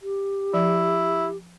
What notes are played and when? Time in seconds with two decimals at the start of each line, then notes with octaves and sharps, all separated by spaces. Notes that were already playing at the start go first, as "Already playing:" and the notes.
0.02 G4
0.54 F3 E4